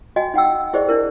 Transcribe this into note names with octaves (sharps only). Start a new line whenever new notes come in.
F#4 D#5 G5 G#5
D#4 F#5 G5 E6
E4 G4 G#4 C5 D5 D#5
D4 E4 A#4